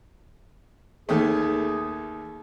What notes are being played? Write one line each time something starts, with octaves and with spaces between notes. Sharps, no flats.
D#2 D#3 A3 G#4